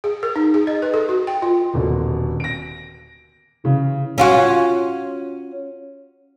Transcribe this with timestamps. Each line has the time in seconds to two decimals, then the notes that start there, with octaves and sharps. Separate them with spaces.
0.04 G#4
0.23 A#4
0.36 D#4
0.54 G#4
0.67 D#5
0.82 B4
0.94 A4
1.09 F#4
1.27 G5
1.42 F4
1.74 D#1 B2 D3
2.40 A#6 D7
3.64 C#3 E3
4.18 C#4 F4 F#4